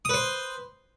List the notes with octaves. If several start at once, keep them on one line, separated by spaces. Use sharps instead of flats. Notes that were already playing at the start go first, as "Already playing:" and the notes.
B4 C5 D#6